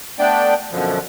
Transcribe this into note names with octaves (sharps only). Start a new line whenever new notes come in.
A3 B3 D4 D5 G5
F#2 B2 D3 F3